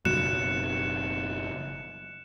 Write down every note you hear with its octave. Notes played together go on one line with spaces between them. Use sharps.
F#1 B2 F#3 F#6 C#7 E7